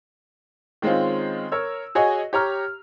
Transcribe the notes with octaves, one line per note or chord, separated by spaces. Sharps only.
D#3 G#3 C4 C#4 F4
A#4 C#5 E6
F#4 G#4 C#5 D#5 G#5
G4 C#5 A#5 F6